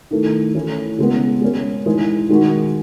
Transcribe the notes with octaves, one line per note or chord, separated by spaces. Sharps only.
D#3 A3 E4
E3 A3 C#4 E4
C#3 G#3 B3
G#3 C#4 G#4
E3 G#3 D#4 G#4
D#3 G#3 D#4 F#4